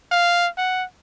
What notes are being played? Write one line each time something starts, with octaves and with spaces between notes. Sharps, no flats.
F5
F#5